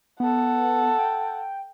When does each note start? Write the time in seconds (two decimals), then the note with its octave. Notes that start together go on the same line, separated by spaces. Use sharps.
0.20 B3 A4 F#5
0.99 G5